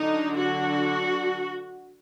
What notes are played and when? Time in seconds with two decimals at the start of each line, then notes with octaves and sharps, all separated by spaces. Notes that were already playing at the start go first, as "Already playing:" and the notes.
Already playing: D3 F#3 D4 D#4
0.33 F#4